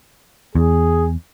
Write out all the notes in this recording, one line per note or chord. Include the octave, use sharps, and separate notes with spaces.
E2 G#4